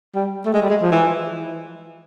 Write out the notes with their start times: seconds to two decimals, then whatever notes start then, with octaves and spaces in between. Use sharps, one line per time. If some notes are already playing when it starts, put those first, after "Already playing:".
0.15 G3
0.46 A3
0.54 G#3
0.62 G3
0.70 G#3
0.82 F3
0.92 E3